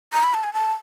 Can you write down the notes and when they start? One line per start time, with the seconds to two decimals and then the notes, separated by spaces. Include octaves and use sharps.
0.13 A#5
0.23 B5
0.34 A5
0.44 G#5
0.54 A5